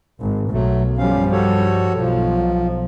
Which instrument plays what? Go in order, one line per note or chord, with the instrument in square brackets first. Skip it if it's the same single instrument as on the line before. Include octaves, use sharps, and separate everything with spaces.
[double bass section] G#1
[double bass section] B1 [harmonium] F#3 A3
[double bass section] G2 F3 G3 [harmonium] C#4 F5
[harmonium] F#4 A4 C#5
[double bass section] B1 [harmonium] F3